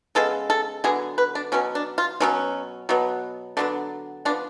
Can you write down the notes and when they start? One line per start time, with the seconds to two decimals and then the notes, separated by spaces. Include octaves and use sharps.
0.15 C#3 G#3 B3 A4
0.50 A4
0.84 D3 F#3 B3 G#4
1.18 B4
1.35 D4
1.52 B2 F#3 B3 C#4
1.75 D4
1.98 F4
2.20 B2 F#3 B3 C#4
2.89 B2 F#3 B3
3.57 D3 F#3 B3 D4
4.25 F3 D4
4.29 B3